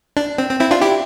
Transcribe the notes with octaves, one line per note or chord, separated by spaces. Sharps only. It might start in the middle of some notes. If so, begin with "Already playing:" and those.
D4
C4
C4
C4 E4
D4 F4
E4 G4